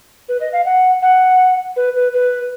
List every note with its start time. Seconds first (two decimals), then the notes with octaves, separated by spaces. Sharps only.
0.29 B4
0.41 D#5
0.53 F5
0.65 F#5
1.02 F#5
1.76 B4
1.95 B4
2.14 B4